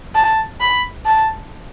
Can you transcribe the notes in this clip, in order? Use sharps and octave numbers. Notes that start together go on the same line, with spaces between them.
A5
B5
A5